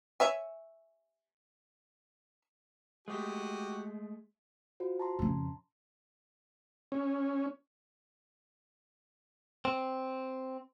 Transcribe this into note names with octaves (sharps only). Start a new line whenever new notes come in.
C#5 E5 G#5
G#3 A3 F#4 G4 G#5
F4 F#4 C5
A5 A#5 C6
F2 C#3
C#4
C4